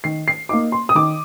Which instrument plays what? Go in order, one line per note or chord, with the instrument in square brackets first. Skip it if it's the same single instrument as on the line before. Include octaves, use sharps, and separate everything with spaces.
[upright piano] D#3 C7
C7
A#3 D#4 D6
C6
D#6
D#3 D6